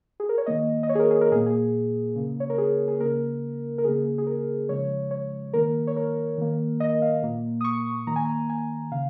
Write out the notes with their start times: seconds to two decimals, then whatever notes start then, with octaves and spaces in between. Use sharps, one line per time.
0.20 G#4
0.29 A#4
0.38 C#5
0.46 D#3 A#3 D#5
0.83 D#5
0.89 C#5
0.95 G#4
1.00 A#4
1.11 G#4
1.21 A#4
1.31 A#2 G#4
1.35 A#3
1.46 G#4
2.15 C#3 A#3
2.40 C#5
2.50 A#4
2.58 G#4
2.88 G#4
3.00 C#3 A#3 A#4
3.78 A#4
3.84 C#3 A#3 G#4
4.18 G#4
4.27 A#4
4.69 C#3 F3 G#3 C#5
5.11 C#5
5.53 D#3 A#3 A#4
5.87 C#5
5.97 A#4
6.38 D#3 A#3
6.80 D#5
7.02 F5
7.22 A#2 A#3
7.61 D#6
7.64 C#6
8.07 D#3 A#3 A#5
8.16 G#5
8.25 A#5
8.49 G#5
8.91 C#3 F5